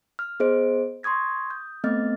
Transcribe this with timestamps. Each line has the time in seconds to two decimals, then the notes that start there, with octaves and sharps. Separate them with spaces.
0.19 F6
0.40 B3 G#4 C5 D#5 D7
1.03 C6 C#6 D#6 G#6 A#6
1.50 D#6 G6
1.84 A3 B3 C4 D#5 F6 A6